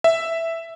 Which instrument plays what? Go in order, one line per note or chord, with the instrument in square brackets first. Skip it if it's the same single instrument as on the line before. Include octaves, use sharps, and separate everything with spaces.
[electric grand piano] E5